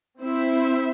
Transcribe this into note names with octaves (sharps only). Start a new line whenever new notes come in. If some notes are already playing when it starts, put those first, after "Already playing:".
C4 E4 C5 E5